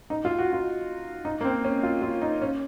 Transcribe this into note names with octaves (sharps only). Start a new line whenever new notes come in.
D#4
F4
F#4
F4
D#4
A#3
C4
C#4
F4
F4
D#4
C#4